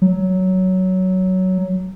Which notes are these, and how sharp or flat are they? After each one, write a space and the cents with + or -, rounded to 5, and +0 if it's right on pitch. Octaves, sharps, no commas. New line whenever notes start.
F#3 +10